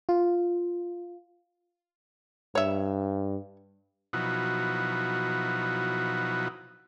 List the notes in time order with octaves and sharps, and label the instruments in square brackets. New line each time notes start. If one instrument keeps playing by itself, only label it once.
[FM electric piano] F4
[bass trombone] G2 [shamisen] C#5 E5
[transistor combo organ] B2 F3 F#3 D#4 E4 F#4